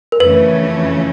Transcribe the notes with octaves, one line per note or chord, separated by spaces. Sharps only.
A#4
F2 C#3 E3 A3 C#4 B4